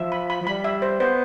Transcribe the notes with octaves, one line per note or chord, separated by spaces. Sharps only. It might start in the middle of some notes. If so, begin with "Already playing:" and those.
Already playing: F3 E5
B5
B5
F3
G3 B5
E5
C5
B3 C5